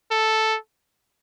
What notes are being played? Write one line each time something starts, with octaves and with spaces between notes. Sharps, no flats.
A4